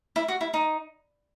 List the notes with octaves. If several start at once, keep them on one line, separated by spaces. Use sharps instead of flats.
E4
F#4
E4
D#4